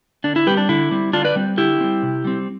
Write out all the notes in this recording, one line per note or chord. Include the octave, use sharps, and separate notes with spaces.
D3 D4
E4
G3 C4 G4 B4
D4
D3 E4
G3 C4
D3 D4 F4
B4 D5
G3 C4
D3 E4 G4
G3 C4
C3
G3 C4